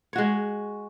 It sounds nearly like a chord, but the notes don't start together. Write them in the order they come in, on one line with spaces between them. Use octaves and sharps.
C#5 F#4 G#3